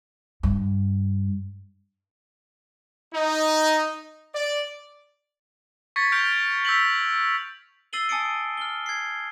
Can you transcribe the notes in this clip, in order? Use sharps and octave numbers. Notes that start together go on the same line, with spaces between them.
G2
D#4
D5
C#6 G#6 A6 B6 C#7
F6 G6 D7 F7
E6 G6 B6 F7 F#7
E6 A6 C7 D#7 F#7 G7
G#5 A5 D#6 A6 C#7 D7
F6 G7
G#6 C7